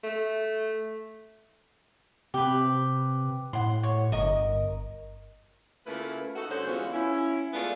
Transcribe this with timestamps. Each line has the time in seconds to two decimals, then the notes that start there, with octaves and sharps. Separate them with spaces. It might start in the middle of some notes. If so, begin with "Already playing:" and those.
0.03 A3
2.34 C3 G4 B4
3.53 A2 F#5 C6
3.83 C#5
4.12 G1 A#4 D#5
5.87 C#3 A3 A#3 E4 F4 B4
6.36 D#4 F#4 A4
6.49 G2 D3 C#4 F#4 A4 C5
6.66 E3 G#3 B3 C#4 F4 F#4
6.93 C#4 E4
7.53 G#3 A3 B3 D4 F4